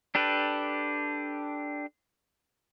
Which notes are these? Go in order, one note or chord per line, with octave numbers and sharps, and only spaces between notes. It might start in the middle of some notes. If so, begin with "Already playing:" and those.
D4 G4 A4 B4